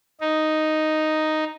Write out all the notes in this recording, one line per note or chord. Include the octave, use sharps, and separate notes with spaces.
D#4